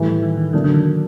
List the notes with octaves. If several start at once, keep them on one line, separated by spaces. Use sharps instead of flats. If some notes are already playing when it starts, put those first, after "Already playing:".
Already playing: A2 D#3 E3 G3
D#3
D#3
D3 F#3 A#3 D4
D3
D#3